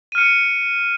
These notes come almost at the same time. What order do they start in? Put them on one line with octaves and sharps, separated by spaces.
D#7 F6 C#7